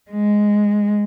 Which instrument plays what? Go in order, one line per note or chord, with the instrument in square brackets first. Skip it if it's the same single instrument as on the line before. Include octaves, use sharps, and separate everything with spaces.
[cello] G#3